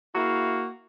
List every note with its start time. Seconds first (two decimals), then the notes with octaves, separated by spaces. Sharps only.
0.15 A#3 E4 F#4 G#4 F5